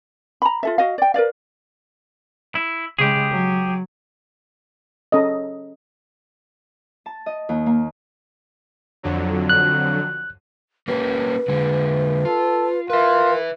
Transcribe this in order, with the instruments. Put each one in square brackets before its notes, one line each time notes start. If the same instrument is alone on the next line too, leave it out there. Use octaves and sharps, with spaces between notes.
[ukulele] A#5 B5
F4 A4 E5
F#4 D#5 F5
D5 G5
A#4 B4 D5 F5
[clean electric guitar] E4
[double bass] C#3 G#3 [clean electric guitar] G4 G#4
[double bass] F#3
[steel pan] C#4 A4 D#5
[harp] A5
D#5
D#2
A#3
[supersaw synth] F2 D3 F#3
[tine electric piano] F#6
[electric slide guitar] A#3 C#4 G4 [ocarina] B4
[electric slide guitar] D3 G#3
[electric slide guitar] F4 [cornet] A4
[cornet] F4 [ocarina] A#4 [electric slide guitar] B4 E5